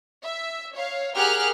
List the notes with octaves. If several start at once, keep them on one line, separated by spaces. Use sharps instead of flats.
E5
C#5 F5
G4 G#4 A#4 F#5 F6 F#6